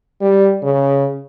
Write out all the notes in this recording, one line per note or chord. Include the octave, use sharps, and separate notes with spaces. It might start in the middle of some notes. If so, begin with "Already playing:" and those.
G3
C#3